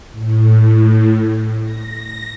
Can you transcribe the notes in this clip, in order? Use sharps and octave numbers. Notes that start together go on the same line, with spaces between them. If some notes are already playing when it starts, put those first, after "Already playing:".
A2
A#6